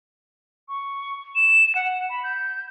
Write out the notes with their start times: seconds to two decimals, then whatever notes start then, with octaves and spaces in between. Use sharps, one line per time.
0.68 C#6
1.35 E7
1.75 F#5
2.09 B5
2.24 G6